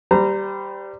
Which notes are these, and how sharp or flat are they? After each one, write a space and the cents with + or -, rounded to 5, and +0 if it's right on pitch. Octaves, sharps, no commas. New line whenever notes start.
G3 +0 C5 -35 A#5 -15